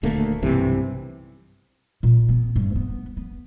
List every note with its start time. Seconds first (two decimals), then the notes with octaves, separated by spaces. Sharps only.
0.03 D#1 D2 A3 A#3
0.42 B1 G2 C3 E3
2.03 A#2
2.29 B3
2.56 G2
2.75 B3
3.17 B3